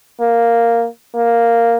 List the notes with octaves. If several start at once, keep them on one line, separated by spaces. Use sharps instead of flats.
A#3
A#3